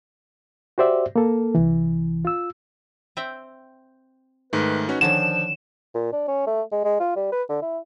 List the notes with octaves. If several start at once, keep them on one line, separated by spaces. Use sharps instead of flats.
F#4 G4 C5 D5 E5
A#3 A4
C2 E3
F4 E6
C4 E5 G5
G#2 D#3 A3 B4
C#4 D#4 F#4 B4
D3 D#3 F3 C#4 D4 E7
A#2
D4
C#4
A3
G#3
G#3
F4
G3
B4
D3
E4